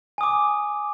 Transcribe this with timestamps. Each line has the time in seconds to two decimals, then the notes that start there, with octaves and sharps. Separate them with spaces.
0.18 G#5
0.21 D#6
0.23 D6